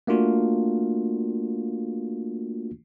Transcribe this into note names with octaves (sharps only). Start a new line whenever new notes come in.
A3 A#3 D4 F4 F#4